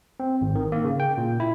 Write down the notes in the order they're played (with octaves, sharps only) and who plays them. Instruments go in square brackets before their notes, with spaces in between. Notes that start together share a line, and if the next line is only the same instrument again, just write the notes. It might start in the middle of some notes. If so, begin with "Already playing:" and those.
[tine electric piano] C4
G#1
D#3
A#3
C#3
G5
A#2
E4